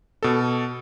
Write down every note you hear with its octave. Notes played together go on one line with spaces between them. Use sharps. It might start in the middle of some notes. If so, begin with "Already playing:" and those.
B2 A4